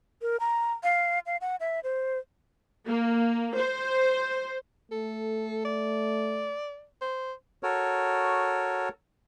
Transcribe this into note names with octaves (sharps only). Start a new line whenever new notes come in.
A#4
A#5
F5
F5
F#5
E5
C5
A#3
C5
A3 A4
D5
C5
F#4 A4 A#4 C#5